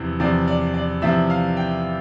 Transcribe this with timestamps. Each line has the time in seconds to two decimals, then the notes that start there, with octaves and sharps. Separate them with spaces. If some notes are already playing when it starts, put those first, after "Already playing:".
Already playing: E2 C3 F3
0.20 E2 C3 F3 D5
0.47 D5
0.74 D5
1.02 E2 C3 F3 E5
1.30 F5
1.57 G5